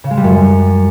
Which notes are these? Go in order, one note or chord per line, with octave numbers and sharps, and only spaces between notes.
C#3
G#3
G3
F#2